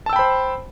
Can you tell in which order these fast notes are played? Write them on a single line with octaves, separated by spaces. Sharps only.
A5 E6 G5 B5 C5